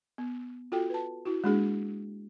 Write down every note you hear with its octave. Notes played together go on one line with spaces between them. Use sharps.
B3
F4 F#4 A4 G5
B4 A5
E4 F#4
G#3 A#3 D4 F#4 G#4